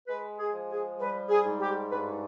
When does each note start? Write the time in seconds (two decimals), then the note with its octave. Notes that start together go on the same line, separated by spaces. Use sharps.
0.08 G#3 B4
0.39 G#4
0.53 F3
0.70 G#4
0.99 G3 B4
1.30 G#4
1.46 G#2
1.60 G4
1.91 G2 B4